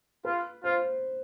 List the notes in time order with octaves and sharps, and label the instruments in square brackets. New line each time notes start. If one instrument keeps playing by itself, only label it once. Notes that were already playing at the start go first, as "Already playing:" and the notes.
[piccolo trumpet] F4 [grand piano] B4
[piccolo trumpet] F4 [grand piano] C5